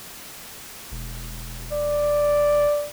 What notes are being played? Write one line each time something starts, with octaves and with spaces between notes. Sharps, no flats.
E1
D5